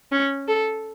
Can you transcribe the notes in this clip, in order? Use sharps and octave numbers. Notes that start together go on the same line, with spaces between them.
C#4
A4